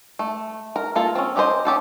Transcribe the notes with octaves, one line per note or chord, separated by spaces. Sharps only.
A3
A#4
A#3 F4 A4
C4 C#4
D#4 G4 A4 C5 D#5
C#4 G4 A4 C5